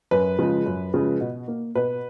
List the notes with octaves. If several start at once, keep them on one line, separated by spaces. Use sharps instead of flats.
F#2 B4
C#3 F3 G#3
F#2
C#3 F3 G#3
B2
A#3
B2 B4